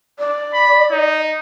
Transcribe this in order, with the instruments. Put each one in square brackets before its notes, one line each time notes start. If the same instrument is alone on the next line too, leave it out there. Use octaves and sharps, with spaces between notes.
[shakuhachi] D5
[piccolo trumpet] B5
D#4